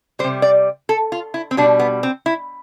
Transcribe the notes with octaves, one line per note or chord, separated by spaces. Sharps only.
C3 G3 C5
D5
A4
F4
E4
C4
B2 G3 D4
B3
C4
E4